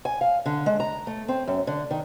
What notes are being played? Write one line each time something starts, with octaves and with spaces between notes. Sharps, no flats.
G#5
F5
D3
G#3
A#5
A3
C4
F#2
D3
D#3